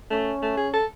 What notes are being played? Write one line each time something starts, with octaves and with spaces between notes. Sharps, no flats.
A3 C#4
A3
G#4
A4